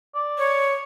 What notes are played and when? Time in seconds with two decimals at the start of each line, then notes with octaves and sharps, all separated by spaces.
0.15 D5
0.38 C#5